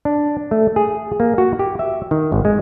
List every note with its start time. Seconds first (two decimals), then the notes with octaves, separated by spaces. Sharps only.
0.05 D4
0.51 A3
0.76 G#4
1.20 A#3
1.38 F#4
1.59 G4
1.79 E5
2.11 D#3
2.32 G#1
2.45 G#3